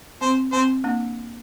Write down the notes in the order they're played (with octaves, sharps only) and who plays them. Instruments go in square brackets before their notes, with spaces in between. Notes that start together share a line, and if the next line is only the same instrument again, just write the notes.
[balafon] C4 [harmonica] C5
[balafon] C4 [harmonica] C5
[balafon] A#3 D4